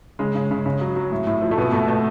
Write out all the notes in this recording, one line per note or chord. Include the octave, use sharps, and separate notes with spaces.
C#3 G#3
C#3
C#3
C#3
F#3
F#3
A2
A2
F3
A3
B2 B3
B2 A3
B2 A3